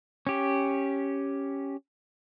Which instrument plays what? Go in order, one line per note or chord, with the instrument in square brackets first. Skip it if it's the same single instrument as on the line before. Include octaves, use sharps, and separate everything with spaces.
[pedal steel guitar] C#4 G4